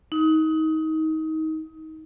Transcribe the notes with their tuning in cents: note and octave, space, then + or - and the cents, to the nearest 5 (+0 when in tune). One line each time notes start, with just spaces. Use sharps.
D#4 +25